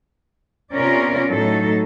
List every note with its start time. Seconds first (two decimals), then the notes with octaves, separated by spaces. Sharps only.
0.74 C3 B3 C#4 F4 A#4 D5
1.29 A2 F#3 D#4 A4